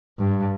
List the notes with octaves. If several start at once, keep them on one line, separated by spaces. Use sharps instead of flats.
G2